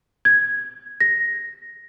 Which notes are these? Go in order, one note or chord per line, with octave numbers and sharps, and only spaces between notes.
G#6
A#6